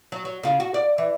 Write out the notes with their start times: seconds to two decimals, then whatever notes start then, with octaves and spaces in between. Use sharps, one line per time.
0.12 F#3
0.25 F#3
0.43 C#3 F4
0.60 F#4
0.74 D5
0.98 E3